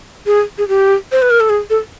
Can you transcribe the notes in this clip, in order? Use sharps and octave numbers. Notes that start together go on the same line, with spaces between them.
G#4
G#4
G4
C5
B4
A#4
A4
G#4
A4